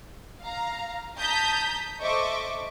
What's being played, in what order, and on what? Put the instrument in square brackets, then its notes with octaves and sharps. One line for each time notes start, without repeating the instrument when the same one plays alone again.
[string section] F5 A#5
A5 A#5 D#6 G6 B6
A4 C5 D#5 E5 C#6 D6